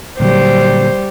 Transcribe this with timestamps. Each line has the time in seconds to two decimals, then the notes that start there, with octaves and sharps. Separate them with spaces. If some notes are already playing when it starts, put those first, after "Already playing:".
0.20 A#2 D3 F#3 G3 C5